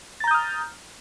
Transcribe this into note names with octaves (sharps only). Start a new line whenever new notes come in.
A#5 D#6 F6 G6 A6